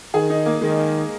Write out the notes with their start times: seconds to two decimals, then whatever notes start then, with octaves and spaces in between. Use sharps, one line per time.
0.14 D#3 G#4
0.30 D#4
0.46 A#3
0.61 D#3 G#3